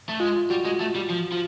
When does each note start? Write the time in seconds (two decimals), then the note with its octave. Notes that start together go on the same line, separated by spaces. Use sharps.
0.09 A3
0.20 G#3 F4
0.50 G3 F#4
0.65 G#3
0.80 A3
0.95 G3
1.10 F3
1.32 F3